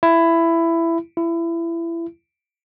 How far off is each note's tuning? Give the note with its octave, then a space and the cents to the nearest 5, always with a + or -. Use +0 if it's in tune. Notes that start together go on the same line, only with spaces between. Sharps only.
E4 +15
E4 +25